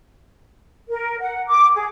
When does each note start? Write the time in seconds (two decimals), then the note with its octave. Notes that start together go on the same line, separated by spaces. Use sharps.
0.91 A#4
1.20 F#5
1.47 D6
1.74 G#4